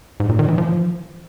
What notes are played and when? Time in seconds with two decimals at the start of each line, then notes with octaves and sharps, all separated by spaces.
0.20 G#2
0.29 A#2
0.39 D#3
0.48 E3
0.58 F3